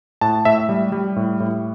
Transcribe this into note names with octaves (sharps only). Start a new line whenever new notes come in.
A2 A5
A2 E5
G3
G3
A2
A2